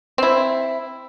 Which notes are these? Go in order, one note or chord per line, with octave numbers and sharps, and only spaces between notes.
C4 E4